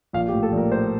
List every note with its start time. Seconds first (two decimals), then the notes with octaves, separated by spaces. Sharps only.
0.13 A#1 F5
0.28 G4
0.33 A2
0.43 A4
0.52 A#1
0.57 A#4
0.72 A2 C5